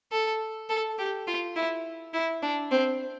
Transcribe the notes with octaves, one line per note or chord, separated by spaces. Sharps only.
A4
A4
G4
F4
E4
E4
D4
C4